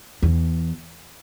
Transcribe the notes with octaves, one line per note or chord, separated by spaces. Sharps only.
E2